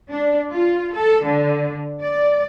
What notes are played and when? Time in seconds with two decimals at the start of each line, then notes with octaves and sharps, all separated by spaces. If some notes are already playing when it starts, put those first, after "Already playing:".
0.11 D4
0.51 F4
0.95 A4
1.25 D3
2.02 D5